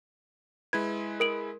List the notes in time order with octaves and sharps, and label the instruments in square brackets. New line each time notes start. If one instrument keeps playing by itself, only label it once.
[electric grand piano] G#3 E4 B4 [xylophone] G#6
[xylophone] A#4 D7 F#7